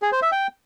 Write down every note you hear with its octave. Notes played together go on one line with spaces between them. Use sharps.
G#4
C5
E5
G5